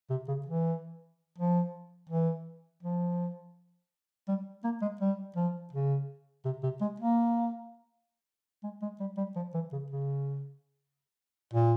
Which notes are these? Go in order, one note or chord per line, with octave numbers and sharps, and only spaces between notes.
C3
C#3
E3
F3
E3
F3
G3
A#3
G#3
G3
F3
C#3
C3
C3
G#3
A#3
G#3
G#3
G3
G3
F3
E3
C#3
C#3
A#2